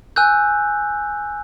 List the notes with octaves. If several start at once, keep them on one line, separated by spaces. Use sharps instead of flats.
G#5 E6 F#6 G6